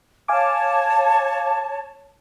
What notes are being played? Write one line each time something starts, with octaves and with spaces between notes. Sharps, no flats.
C#5 F5 G#5 A5 D6